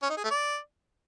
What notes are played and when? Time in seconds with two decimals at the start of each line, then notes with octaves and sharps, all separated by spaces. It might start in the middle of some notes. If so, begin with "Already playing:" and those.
0.03 C#4
0.10 D#4
0.17 G#4
0.24 A3
0.31 D5